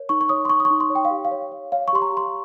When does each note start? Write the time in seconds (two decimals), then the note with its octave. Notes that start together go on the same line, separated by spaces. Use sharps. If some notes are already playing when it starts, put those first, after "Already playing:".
Already playing: A#4 C#5
0.09 D#4 C#6
0.21 C#6
0.29 C#5 D#6
0.45 C6
0.49 D#4 C#6
0.60 D#6
0.65 C#6
0.70 D#4
0.80 C6
0.90 C#5
0.95 G5
1.05 F5
1.10 G4
1.25 F5
1.31 C#5
1.52 C#5
1.72 C#5 F5
1.88 C#6
1.93 G4 C6
2.02 A#5
2.12 G4 C6